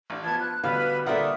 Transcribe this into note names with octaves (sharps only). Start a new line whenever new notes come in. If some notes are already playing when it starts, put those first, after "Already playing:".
A1 D4
F3 B3 A5 G#6
F#6
B2 D3 G3 B4 F5 B5
D3 G3 A#3 F4 G4 E5 F#5 D#6